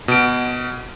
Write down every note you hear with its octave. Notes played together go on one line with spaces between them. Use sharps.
B2 D7